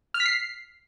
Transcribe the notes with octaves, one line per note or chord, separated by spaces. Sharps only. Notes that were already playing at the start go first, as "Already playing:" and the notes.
F6
B6
C7